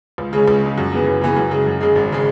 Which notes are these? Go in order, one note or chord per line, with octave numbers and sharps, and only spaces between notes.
C#2
C#3 G#3 C#4
C#2
C#3 G#3 C#4
F#2
C#3 E3 B3
F#2
C#3 E3 B3
F#2
C#3 G#3
F#2
C#3 G#3
G#1
C#3 G#3